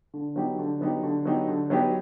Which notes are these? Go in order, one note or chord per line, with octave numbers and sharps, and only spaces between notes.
D3
F#3 B3 D#4 G4
D3
F#3 B3 D#4 G4
D3
F#3 B3 D#4 G4
D3
F#3 B3 D#4 G4